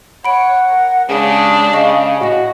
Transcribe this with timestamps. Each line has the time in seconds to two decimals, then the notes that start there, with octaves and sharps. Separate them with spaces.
0.25 C#5 F#5 B5 D7
0.68 A#4
1.09 C#3 G#3 D4 G4 G#4
1.73 C#3 D#5 F5 C#6
2.21 A2 F#4 D#5 F#5 G#5